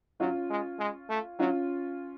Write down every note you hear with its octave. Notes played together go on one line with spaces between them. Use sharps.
F#3 C#4 F4
G#3
G#3
A3
F#3 C#4 F4